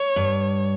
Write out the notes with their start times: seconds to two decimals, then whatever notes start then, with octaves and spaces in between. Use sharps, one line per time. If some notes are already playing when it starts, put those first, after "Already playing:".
Already playing: C#5
0.16 G2